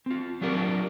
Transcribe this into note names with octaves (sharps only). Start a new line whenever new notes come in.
C4 F4
F#3 D4 F4 G4 A#4